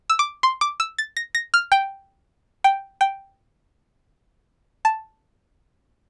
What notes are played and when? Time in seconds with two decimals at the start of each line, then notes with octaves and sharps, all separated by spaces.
0.10 E6
0.19 D6
0.43 C6
0.61 D6
0.80 E6
0.98 A6
1.17 A#6
1.35 A#6
1.54 F6
1.72 G5
2.64 G5
3.01 G5
4.85 A5